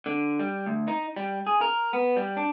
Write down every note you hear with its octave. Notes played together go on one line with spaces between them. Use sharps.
D3
G3
D2
D#4
G3
G#4
A#4
B3
G3
D4